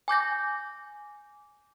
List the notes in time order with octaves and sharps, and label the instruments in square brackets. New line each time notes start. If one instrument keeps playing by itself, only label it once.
[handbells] G#5 D6 G6 A#6